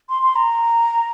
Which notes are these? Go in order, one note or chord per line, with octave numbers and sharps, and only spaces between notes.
C6
C6
A#5